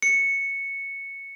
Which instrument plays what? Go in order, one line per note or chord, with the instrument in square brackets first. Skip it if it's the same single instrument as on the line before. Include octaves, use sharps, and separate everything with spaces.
[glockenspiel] C#7